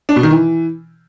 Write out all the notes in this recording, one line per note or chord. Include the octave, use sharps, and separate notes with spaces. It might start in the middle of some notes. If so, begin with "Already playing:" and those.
D4
B2
D#3
E3